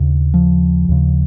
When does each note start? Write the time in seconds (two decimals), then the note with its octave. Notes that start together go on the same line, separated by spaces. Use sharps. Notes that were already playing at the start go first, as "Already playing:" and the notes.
Already playing: D#2 C#3
0.34 F3
0.89 D#2 C#3